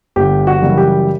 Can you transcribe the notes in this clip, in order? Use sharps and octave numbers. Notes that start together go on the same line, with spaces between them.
G1 G4
F#4
F#2 C#3 E3 G3
G4